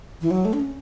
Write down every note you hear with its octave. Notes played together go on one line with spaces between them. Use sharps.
E3
F#3
A3
D4
C#4